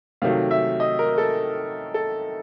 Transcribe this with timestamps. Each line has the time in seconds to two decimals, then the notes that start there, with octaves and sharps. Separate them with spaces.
0.22 C3 D#3 F#3 A3 F5
0.51 E5
0.80 D#5
0.99 A#4
1.18 A4
1.94 A4